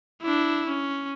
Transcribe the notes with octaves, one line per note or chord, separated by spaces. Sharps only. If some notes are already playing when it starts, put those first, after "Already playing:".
D4 E4
C#4